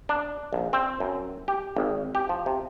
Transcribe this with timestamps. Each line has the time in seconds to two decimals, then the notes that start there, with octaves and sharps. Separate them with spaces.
0.09 D4
0.53 A#1
0.73 C4
1.00 F#2
1.48 G4
1.76 G#1
2.15 G4
2.29 F3
2.46 C3